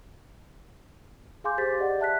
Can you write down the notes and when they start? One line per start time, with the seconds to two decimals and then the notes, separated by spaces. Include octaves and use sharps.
1.44 G#4 F5 G#5 C6 D6 G6
1.57 G4 G#4 C5 A6 B6
1.78 G4 G#4 D5 D#5 F#5
2.00 E5 A5 F#6 B6